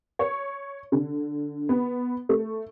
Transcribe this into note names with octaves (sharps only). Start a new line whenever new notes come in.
C#5
D3
B3
A3